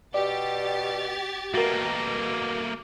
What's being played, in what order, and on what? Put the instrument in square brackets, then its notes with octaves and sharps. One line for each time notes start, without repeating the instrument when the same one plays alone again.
[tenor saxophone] B2 [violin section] G4 A6 [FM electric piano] D5
[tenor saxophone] B2 [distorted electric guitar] A3 A#3 [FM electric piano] F#4 A#4